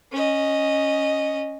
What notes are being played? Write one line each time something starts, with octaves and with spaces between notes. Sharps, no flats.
C#4 D#5